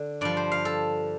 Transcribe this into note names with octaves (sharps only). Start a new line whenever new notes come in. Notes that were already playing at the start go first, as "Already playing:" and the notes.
Already playing: D3
G2 F3 D5
C5
F5
A4